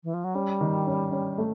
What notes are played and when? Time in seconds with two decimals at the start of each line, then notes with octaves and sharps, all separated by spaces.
0.04 E3
0.14 F3
0.24 F#3
0.35 G3 C#4
0.61 D#3
0.87 C#4
1.12 C#4
1.38 A3